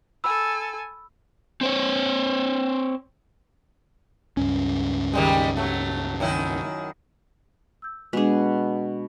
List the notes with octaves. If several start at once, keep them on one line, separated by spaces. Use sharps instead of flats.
A4 G#5 B5 E6
C4 C5 C#5
C#2 G2 C#4
D#3 G3 G#3
F#3 A3
F#2 D#3 E4
E6 G6
B2 G#3 D4 G#4